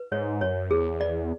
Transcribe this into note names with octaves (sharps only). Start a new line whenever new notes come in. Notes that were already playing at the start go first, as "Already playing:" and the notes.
Already playing: B4
G#2 C#5
F#2 C#5
E2 G#4
D5